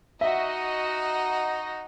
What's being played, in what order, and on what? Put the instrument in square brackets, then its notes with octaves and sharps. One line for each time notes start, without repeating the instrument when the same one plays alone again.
[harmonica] D#4 [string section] F#4 D#5 [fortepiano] E5